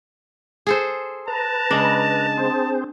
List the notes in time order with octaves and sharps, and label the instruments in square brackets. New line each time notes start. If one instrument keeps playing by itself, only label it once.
[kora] G#4 A4 C5
[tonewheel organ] B4 A#5 [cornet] A5
[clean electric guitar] C#3 G#3 [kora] D4
[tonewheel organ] C4 G#4 C5